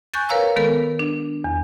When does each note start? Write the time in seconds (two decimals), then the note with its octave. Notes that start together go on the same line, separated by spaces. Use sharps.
0.14 G#5 C#6 F#6 G6 A6
0.29 A#4 B4 C#5 F5 A#5 E6
0.56 D#3 G#3 B3 A4 A#4
0.99 D4
1.44 E2